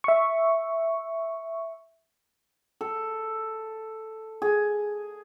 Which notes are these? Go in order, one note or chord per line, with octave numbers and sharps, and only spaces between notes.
E5 C#6
A4
G#4